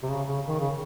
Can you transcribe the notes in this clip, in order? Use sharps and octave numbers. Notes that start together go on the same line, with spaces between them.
C3
C#3
C#3
D#3
C#3